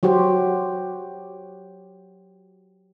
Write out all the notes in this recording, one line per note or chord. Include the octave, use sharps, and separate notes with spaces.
F#3 F#4 G4 C5